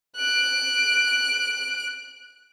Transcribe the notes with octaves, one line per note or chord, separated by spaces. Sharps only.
F#6 D7